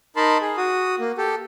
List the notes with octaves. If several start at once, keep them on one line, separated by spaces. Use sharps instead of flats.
D#4 A#4 A5 B5 C6
G#4
F#4 D#6
A#3
G4 A4